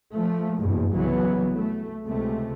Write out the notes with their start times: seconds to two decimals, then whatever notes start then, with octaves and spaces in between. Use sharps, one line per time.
0.15 F3 A3
0.58 F#1 E2 G2 B2
0.94 C2 C#3 E3 F#3 B3
1.54 A3
2.05 C#2 C3 A3